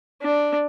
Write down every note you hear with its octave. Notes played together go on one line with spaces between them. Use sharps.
D4